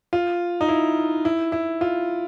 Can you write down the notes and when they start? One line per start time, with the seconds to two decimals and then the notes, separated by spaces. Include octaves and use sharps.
0.13 F4
0.61 D#4
0.69 E4
1.25 E4
1.52 E4
1.81 F4